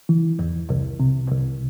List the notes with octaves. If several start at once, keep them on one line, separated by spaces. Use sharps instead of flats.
E3
E2
C2
C3
C2